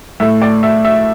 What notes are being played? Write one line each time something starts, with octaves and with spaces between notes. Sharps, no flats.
A2 A3 E5
D5
E5
E5